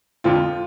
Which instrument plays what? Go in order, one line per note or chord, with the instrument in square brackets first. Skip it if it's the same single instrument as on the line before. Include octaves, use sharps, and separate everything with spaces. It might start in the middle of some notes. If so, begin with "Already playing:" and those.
[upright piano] F2 D3 F3 C4 F4